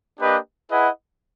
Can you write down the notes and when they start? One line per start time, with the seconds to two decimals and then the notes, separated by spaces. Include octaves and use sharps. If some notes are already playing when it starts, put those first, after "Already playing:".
0.19 A#3 D4 G4 B4 D#5
0.70 E4 G#4 B4 D#5 F#5